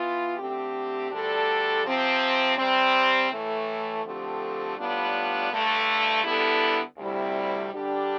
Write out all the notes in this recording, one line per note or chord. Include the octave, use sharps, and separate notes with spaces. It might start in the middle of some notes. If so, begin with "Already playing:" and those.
Already playing: E3 B3 F4
D3 A3 C4 G4
D2 D3 G3 D4 A4
C3 F3 C4
C3 G3 C4
A2 E3 A3
D3 F3 A3 C4 G4
A2 G3 B3 D4 F4
G2 D3 A3
D3 G3 B3 E4 A4
D2 C3 G3 C4 E4
D3 G3 D4 G4